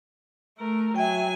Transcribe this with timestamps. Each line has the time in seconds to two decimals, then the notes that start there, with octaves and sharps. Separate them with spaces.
0.58 A3 A#4
0.96 F#3 E5 G5 G#5